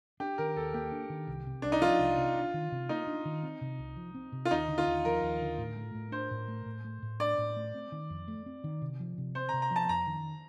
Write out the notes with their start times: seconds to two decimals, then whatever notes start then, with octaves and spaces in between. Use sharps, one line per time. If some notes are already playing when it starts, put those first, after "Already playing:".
0.20 D4 G4
0.38 D#3 A#4
0.56 D#2 A4
0.74 A#3 G4
0.92 D4
1.10 D#3
1.27 C2
1.46 C3
1.62 C2 D4
1.72 D#4
1.81 F3 F4
1.99 C2
2.17 C3
2.35 D4
2.54 D#3
2.72 C3
2.89 A#3 D#4
3.07 D4
3.25 D#3
3.43 C4
3.61 C3
3.79 C2
3.96 F3
4.15 C4
4.32 C3
4.45 F4
4.51 D#2 D#4
4.68 D3
4.78 F4
4.87 D#2
5.04 F3 A#4
5.23 D#2
5.41 D3
5.58 A2
5.77 A3
5.95 A2
6.12 D4 C5
6.31 A2
6.48 A3
6.66 A2
6.84 A3
7.02 A2
7.20 D4 D5
7.38 A2
7.56 A3
7.74 C4
7.92 D#3
8.10 F2
8.28 A3
8.46 C4
8.64 D#3
8.82 C3
9.00 F3
9.18 C3
9.35 C4 C5
9.49 A#5
9.53 C3
9.62 A#5
9.71 F3 A5
9.89 F2 A#5
10.07 D#3